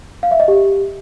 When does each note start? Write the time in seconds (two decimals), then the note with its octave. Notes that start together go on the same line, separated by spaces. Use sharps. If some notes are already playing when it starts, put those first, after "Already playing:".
0.23 F5
0.31 E5
0.40 D#5
0.48 G4